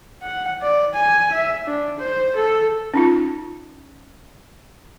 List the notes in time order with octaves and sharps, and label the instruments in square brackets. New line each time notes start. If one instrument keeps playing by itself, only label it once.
[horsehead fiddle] F#5
D5
G#5
E5
D4
C5
A4
[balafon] C#4 D#4 F4